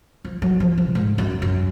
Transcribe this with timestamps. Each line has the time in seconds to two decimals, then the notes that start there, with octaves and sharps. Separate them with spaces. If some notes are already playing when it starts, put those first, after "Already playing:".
0.25 F3
0.42 F#3
0.60 F3
0.78 F3
0.87 A#2
0.95 G#2
1.18 F#2
1.42 F#2